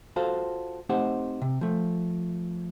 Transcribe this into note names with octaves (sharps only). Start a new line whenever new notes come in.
F4 F#4 A4 C5 F5
A3 C4 D#4 G4 C5 F#5
C3
F3 A3